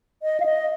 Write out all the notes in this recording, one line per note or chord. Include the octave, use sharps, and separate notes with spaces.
D#5
F5
D#5